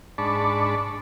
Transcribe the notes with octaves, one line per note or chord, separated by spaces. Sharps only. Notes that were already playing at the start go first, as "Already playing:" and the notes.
G#2 D4 D5 A5 B5 C#6